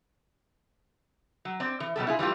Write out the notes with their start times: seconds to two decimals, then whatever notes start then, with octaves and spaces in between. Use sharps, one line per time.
1.45 F#3
1.60 C4 D5
1.80 E3
1.96 B2 F#3 G3 A4
2.07 E4 F4 G#4
2.19 E3 G3 A3 F4